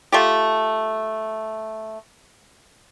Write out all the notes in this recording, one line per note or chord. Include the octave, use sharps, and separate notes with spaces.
A3 F4 G4